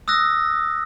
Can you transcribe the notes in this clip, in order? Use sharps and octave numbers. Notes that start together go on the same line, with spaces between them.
D#6 E6 F#6 A#6